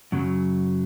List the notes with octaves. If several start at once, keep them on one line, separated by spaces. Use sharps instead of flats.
F#2 C#3 F#3